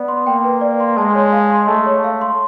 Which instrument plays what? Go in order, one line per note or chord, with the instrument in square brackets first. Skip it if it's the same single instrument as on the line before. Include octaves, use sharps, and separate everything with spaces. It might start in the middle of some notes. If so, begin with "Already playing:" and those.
Already playing: [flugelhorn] B3 [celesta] D5
[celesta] C6
[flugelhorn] A#3 [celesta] G5
[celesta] B4
D5
C6
[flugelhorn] G#3 [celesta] A5
[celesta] C#5
F5
C6
[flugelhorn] A3 [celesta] A5
[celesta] C#5
F5
C6